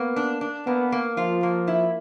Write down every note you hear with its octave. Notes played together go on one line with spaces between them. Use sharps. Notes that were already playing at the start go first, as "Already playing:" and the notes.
Already playing: A#3 B3
D4
D4
A#3 B3
A#3
F3 F4
A#3
E4